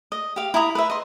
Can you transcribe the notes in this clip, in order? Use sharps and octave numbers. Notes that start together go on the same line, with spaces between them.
D#5
G4 F5
E4 E5 A#5 D#6
B4 E5
D#5 C6